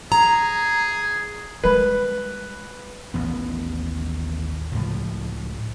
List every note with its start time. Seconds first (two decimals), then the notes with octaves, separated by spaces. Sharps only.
0.12 G#4 A#5
1.64 G3 G#3 B4
3.14 A1 D#2 B3
4.72 C#2 A2 F3